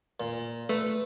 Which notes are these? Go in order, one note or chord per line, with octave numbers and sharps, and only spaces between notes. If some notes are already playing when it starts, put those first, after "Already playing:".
A#2
A3 B4